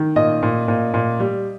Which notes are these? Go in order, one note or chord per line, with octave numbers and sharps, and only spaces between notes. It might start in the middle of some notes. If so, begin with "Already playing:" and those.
Already playing: D#3
A#2 D#5
A#2
A#2
A#2
G3